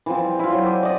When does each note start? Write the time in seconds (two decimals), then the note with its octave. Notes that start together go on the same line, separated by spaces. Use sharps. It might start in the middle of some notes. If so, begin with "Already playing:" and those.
0.06 E3 F3 C4
0.24 G3
0.39 E4 F4
0.53 F#3
0.64 C5 G#5 D6
0.83 D5 D#5